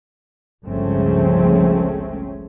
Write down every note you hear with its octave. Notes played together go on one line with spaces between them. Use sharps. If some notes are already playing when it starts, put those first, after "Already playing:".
G1 C#2 F3 A3 C4 C#4